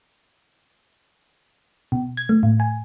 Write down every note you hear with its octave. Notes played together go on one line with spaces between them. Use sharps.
B2
G#6
A3
A2
G#5